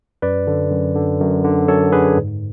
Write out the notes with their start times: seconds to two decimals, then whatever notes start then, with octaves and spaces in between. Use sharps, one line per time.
0.22 F#2 B4 D5
0.47 D3
0.71 F#2
0.96 D3
1.20 F#2
1.44 D3
1.68 F#2 A4 C#5
1.92 D3 G#4 B4
2.17 G#2